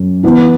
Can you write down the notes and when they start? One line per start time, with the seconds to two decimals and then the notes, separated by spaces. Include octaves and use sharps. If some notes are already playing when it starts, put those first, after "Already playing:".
Already playing: F#2
0.23 E3 B3 E4